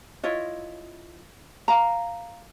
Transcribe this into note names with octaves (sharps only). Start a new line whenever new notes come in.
E4 F4 C#5 D#5
F5 A#5